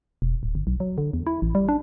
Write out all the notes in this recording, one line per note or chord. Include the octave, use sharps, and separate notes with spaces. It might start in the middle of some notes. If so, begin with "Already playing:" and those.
E1
D1
G1
B1
F#3
D3
E2
E4
A1
G3
D4